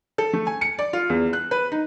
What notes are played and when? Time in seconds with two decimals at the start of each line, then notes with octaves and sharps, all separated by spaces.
0.18 A4
0.33 A3
0.47 G#5
0.61 C#7
0.78 D5
0.93 F4
1.09 E2
1.33 F#6
1.51 B4
1.72 D#4